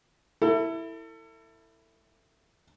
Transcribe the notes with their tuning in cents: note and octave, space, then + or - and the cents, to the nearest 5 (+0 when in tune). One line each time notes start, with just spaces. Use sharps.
E4 +0 A4 +35